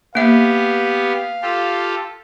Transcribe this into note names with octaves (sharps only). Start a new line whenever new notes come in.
A#3 B3 G4 E5 F5
F4 G4 A4